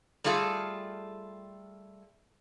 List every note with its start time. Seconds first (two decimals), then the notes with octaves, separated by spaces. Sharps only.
0.24 G3 A3 F4 G#4 A4